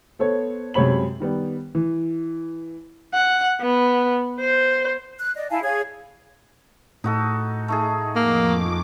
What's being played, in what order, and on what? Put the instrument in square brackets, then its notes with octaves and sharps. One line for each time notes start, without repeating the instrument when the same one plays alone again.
[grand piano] B3 A4 C5 C#5
F#2 C3 G#3 C#5 B5 F#7
D#3 G3 B3
E3
[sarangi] F#5
B3
C5
[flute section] F#6
D5 D#5
E4 F5 G#5 A5
G#4 C#5 F5 G#6
[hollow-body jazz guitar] A2 [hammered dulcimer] D#4 F#4 A4
[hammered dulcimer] A3 D#4 G#4
[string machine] F2 D6 [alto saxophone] A#3